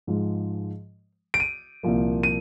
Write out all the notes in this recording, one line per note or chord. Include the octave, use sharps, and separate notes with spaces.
G#2 F3 G#3
D7
D#7
C2 A#2 F3 A#3
D#7